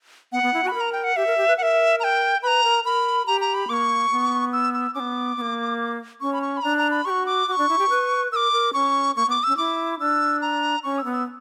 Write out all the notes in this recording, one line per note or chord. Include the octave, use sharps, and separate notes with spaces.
B3 F#5
B3
E4
F#4 B5
A#4
A#5
G5
F#5
G4 E5
A#4
G4
B4
A#4 E5 F#5
A#5
G5
B4 A#5 B5
A#4
A#4 B5
G4 A#5
A#5
B5
A#3 C#6 D6
B3
E6
E6
C#4 D6
B3
B3
A#3
C#4 C#6
B5
C#6
B5
D4 A#5
A#5
B5
G4 C#6
F#4
D6
F#4 D6
C#6
D4
E4
G4
B4
A#4 D6 E6
A#4
C#4 C#6
A#3 C#6
B3 D6
C#4 E6
E4 D6
D4 E6
A#5
C#4 C#6
E6
B3
E6